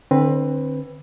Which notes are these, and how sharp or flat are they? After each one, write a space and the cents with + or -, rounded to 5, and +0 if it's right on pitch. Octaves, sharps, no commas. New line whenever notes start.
D3 +25 C4 +25 B4 +0